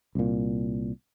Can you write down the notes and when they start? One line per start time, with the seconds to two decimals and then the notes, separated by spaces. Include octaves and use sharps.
0.15 C2 A#2